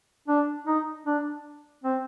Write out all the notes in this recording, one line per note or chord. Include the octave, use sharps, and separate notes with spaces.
D4
D#4
D4
C4